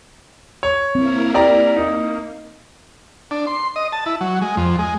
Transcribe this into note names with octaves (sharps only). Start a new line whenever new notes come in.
C#5
A#3 C4 E4 A#4
G4 D5 A#5
A#3 D#4
D4
C6
D#5
A5
E4
F#3
G#3
F2
G#3